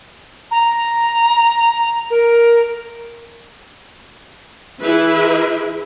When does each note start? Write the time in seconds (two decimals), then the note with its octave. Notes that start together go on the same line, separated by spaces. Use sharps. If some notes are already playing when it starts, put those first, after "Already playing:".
0.51 A#5
2.10 A#4
4.82 E3 E4 G#4 B4 E5